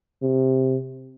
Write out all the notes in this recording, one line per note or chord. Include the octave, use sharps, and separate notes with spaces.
C3